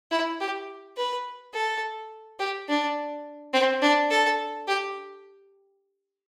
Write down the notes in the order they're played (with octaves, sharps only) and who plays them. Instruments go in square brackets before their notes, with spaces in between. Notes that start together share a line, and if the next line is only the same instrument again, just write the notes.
[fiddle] E4
G4
B4
A4
G4
D4
C4
D4
A4
G4